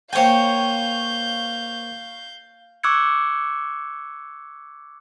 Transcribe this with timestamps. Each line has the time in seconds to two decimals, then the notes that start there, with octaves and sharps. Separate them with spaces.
0.13 A#3 C5 C#5 F5 G5 G#5 G6
2.83 C#6 D6 E6 F#6 G#6 C#7